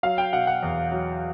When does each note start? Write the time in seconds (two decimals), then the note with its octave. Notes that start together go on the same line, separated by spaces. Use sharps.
0.03 F#3 F5
0.18 G5
0.33 B2 F#5
0.47 F#5
0.63 E2
0.92 F#3